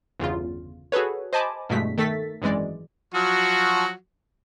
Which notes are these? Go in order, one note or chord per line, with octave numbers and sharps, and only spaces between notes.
G1 E2 C#3 F4
F#4 G#4 A4 B4 C#5
C5 D#5 G#5 A5 B5 D6
E2 G2 B2 G#3 A3 B6
D#3 A3 A4 A6 B6
G#1 F#2 E3 G#3 D5
F3 F#3 F#4